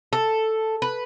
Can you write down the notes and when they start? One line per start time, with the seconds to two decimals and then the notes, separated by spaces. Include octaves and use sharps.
0.13 A4
0.82 B4